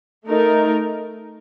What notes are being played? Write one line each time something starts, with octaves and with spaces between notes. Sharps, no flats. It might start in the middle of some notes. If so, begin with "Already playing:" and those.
A3 D#4 A#4